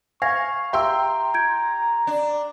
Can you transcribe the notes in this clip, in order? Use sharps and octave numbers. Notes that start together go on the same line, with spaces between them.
F5 G#5 C#6 G#6 A#6
G4 E5 G5 A#5 C6 E6
G6 G#6 D7
D4